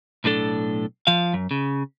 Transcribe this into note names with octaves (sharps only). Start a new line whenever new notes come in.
B1 A2 D4 A4
F3 F5
F#2
C#3